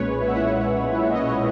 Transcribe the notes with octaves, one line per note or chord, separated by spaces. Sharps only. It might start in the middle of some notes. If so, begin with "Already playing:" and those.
Already playing: B1 A#2 G#3 C#4 B4 C#5
E5
F#5
E4 E5
E5
D#5
C#5